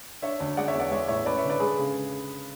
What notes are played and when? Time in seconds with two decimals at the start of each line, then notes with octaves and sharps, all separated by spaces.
0.22 D4 C#5 E5
0.40 D2
0.57 G#3 D5 F#5
0.68 C#5 E5
0.74 E2
0.79 D5 F#5
0.91 G#3 C#5 E5
1.08 A2 C#5 E5
1.25 C#4 B4 D5
1.37 C#5 E5
1.43 D3
1.49 B4 D5
1.60 G#3 G#4 B4
1.78 C#3